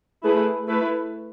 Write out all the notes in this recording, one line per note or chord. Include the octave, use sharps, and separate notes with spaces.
A3 E4 G#4 B4
A3 E4 B4